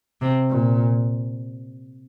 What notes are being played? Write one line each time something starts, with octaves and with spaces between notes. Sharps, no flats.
C3
A#2